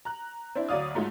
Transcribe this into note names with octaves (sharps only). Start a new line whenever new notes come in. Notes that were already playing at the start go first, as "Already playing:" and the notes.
A#5 F#6
C4 D4 E4
D2 F#3 C#5 D5 F5 D#6
G#2 F#3 G#3 A3 D#4 F4